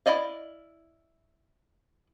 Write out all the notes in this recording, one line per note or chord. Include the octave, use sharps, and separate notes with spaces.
E4 F#4 D5 D#5 F5